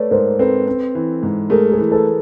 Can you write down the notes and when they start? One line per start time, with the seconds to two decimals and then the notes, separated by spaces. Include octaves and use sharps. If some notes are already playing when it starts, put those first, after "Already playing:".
Already playing: A3 B4 C#5 D5
0.11 G#2 A#4 C5
0.39 C4 A4 B4
0.67 C4
0.95 E3
1.23 G#2
1.50 A3 G#4 A#4
1.72 G#4 A#4
1.78 E3
1.92 A4 B4